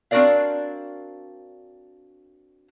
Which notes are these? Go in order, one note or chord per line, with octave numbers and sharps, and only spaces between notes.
C4 D4 F#4 A#4 D5 F5